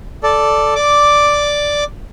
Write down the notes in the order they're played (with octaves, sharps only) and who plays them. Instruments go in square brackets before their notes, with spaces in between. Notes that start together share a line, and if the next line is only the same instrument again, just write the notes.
[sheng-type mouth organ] A4 D5
D5 D6